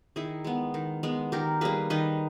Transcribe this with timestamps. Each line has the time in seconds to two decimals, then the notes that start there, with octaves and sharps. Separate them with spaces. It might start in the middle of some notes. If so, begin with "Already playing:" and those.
0.16 D#3 E4 G#4
0.44 G#3 B3
0.74 D#3
1.03 G#3 B3
1.32 D#3 G4 A#4
1.61 G3 A#3 G#4 B4
1.90 D#3 B4 D#5